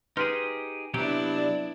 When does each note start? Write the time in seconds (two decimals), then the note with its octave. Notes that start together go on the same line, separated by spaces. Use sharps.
0.17 D#4 G4 G#4 B4 C6 F6
0.94 C3 F#3 B3 D4 E4 G4 A#5 D7
1.38 D5